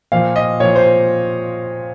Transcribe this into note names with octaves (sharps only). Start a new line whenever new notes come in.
A#2 F3 F5
D#5
A#2 F3 C#5
C5